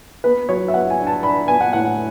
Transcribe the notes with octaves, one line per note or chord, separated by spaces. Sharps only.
B3 B4
F#3 C#5
E5
B3 F#5
G#5
D4
A5
D4 B5
B3 G#5
F#5
A2 F#5